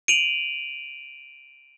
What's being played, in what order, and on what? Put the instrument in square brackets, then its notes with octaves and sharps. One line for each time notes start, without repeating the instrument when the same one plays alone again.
[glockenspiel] D7 D#7 F7 F#7